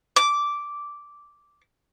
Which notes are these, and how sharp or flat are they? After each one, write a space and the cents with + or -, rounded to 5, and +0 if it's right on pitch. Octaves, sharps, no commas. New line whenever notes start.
D6 -10